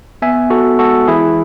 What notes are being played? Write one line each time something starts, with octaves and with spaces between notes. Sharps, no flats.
B3 E5 G#5
B3 F#4 A4
G#3 F#4 A4
E3 E4 G#4